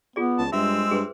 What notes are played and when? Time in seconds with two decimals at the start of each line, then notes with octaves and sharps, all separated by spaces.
0.16 B3 F4 G#4 D5
0.39 C#2 A5
0.52 G2 G#3 C4 E5 E6
0.91 G2 G#4 B4 C5